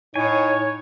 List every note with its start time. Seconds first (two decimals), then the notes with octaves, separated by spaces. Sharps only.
0.16 A2 D#4 C#5 G#5